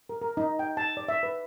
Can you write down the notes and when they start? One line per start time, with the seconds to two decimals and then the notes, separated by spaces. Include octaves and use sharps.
0.09 A#4
0.22 A#4
0.37 D#4
0.59 G5
0.77 A5
0.97 D5
1.08 E5
1.23 B4